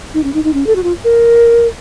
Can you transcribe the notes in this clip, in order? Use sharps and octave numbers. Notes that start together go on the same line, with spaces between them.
D#4
C#4
D#4
D#4
C#4
A4
F#4
F4
A#4